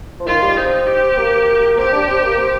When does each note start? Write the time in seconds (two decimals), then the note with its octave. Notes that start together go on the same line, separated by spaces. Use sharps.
0.20 F3
0.26 D#3 F4
0.42 G3
0.57 C4 D#4
0.87 G4
1.17 A#3
1.78 C4 G4
1.93 D4
2.08 C4
2.23 A#3
2.38 C4